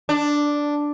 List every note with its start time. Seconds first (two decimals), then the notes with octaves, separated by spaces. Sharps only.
0.09 D4